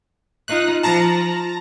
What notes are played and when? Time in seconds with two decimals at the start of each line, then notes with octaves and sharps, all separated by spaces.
0.48 D#4 F4 F#6
0.83 F3 A5 A#5 A#6